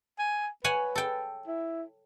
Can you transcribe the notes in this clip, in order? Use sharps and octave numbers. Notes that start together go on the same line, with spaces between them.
G#5
B4 C#5 F#5 G#5
A4 G5
E4